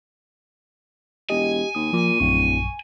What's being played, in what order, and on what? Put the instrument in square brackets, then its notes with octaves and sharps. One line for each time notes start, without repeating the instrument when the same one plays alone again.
[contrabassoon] E1 [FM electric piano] G4 D#5 [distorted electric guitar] G#5
[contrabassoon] D#2 [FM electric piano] D#6
[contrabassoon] A#2 [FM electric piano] F3
[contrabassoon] D1 [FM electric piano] A#1 F#2 C#6